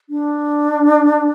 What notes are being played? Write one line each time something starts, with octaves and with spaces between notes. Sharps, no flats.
D4